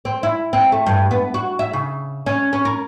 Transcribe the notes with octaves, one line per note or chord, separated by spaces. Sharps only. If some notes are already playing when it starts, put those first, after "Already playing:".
C4
E4
C4
A3
G2
B3
F#4
E5
C#3
C#4
C#4
A#4